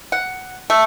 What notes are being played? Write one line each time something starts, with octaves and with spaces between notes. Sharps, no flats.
F#5
A3